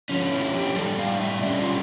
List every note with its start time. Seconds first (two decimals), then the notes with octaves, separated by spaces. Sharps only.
0.09 D3 F3 C#4
0.31 E4
0.54 G4
0.76 A2 G3 D4 A4
0.99 F5
1.21 E5
1.43 D3 G3 C#4 D5
1.60 F4